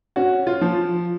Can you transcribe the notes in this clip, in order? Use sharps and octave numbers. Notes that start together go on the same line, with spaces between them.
C#4 F#4
F4
F3